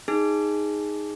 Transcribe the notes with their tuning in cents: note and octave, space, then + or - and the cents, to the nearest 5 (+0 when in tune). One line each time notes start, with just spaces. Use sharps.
D#4 +0 G#4 -5